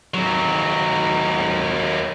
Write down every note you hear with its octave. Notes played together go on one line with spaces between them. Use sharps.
D#2 F#3